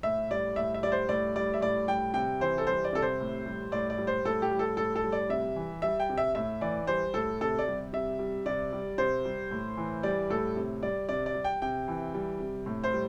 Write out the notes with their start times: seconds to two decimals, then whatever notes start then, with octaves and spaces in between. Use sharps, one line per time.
0.03 A2 E5
0.30 G3 D5
0.56 A2 E5
0.74 E5
0.83 G3 D5
0.92 C5
1.09 A2 D5
1.36 G3 D5
1.54 E5
1.61 A2 D5
1.87 G3 G5
2.14 C3 G5
2.40 E3 C5
2.58 A4
2.67 G3 C5
2.85 D5
2.93 C3 A4
3.02 C5
3.20 A2
3.46 G3
3.72 A2 D5
3.90 D5
3.98 G3
4.07 C5
4.25 A2 A4
4.42 G4
4.51 G3
4.59 A4
4.77 A2 A4
4.96 A4
5.03 G3
5.12 D5
5.29 C3 E5
5.56 E3
5.82 G3 E5
6.00 G5
6.10 C3
6.18 E5
6.35 A2 E5
6.61 E3 D5
6.87 G3 C5
7.14 A2 A4
7.41 C3 A4
7.59 D5
7.67 G3
7.93 C3 E5
8.19 G3
8.46 C3 D5
8.73 G3
8.98 C3 C5
9.25 G3
9.51 A2
9.77 E3
10.03 G3 D5
10.30 A2 A4
10.57 C3
10.82 G3 D5
11.09 C3 D5
11.26 D5
11.35 G3
11.44 G5
11.62 C3 G5
11.88 E3
12.14 G3
12.40 C3
12.66 A2
12.84 C5
12.93 G3